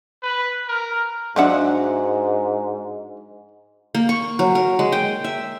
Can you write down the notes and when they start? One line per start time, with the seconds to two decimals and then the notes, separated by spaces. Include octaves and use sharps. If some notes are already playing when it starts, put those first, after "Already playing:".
0.23 B4
0.68 A#4
1.36 G#2 F3 F#3 D4 F#4 E5 F#5
3.95 A#3
4.09 C#6
4.39 F#3
4.55 A#4
4.79 G#3
4.92 G5
5.24 E5